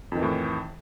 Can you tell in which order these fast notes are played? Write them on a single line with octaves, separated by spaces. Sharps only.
F2 D#3 E3 A2